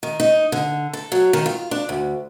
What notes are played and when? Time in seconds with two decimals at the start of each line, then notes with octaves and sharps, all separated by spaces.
0.03 D#3
0.20 D#4
0.52 D3
0.93 A4
1.12 F#3
1.33 D#3
1.46 F4
1.71 D4
1.89 D2